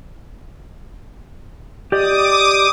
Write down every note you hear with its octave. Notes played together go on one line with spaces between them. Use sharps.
G4 D5 D#5 D6 D#6